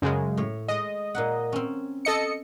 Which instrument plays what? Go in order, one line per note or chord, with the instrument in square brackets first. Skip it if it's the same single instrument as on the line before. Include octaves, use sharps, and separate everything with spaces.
[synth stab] F#2 C#3 G#3
[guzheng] A2 C#5
[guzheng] G#3 [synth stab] D#5
[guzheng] A#2 D#4 F#5
C4 C#4
[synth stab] A4 D#5 C#7